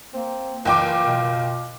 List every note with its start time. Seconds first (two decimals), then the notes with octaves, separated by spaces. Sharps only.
0.14 A#3 C4
0.65 F#1 E3 F4 G5 D6
1.06 B2